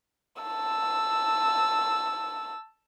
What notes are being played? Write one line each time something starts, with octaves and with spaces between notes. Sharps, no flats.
A5 E6